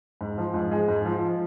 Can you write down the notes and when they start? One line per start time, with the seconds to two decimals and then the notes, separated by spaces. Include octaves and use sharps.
0.21 G#2
0.38 F3
0.54 G#2
0.71 G#3
0.88 G#2
1.05 F3